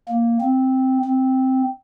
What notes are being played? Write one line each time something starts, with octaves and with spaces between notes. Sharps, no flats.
A#3
C4
C4